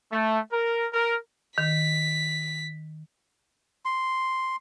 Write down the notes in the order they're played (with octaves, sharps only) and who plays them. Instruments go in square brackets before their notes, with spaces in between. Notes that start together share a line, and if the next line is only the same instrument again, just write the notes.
[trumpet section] A3
A#4
A#4
[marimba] D#3 [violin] B6
[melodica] C6